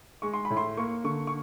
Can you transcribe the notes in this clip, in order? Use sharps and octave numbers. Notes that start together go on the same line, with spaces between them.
G#3 C#6
C6
B5
A2
C6
A#3 C#6
D3 C#6
C#6